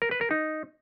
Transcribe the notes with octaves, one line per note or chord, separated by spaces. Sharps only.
A#4
B4
A#4
D#4